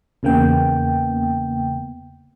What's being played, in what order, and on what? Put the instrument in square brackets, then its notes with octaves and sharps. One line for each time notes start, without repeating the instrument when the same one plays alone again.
[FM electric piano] E2 C#3 A#3 B3 G5